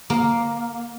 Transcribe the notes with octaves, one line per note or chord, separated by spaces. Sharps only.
A#3